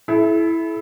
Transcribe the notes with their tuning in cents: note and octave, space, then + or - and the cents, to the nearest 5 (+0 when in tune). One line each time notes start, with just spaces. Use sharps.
E4 +0 A4 -45